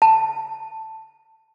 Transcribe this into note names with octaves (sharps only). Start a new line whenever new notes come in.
A5